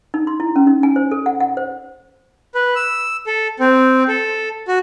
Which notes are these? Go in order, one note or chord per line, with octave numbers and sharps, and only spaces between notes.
D#4
C6
E4
C#4
D#4
G#5
C5
A4
F#5
F#5
C5
B4
E6
A4
C4
A4
F#4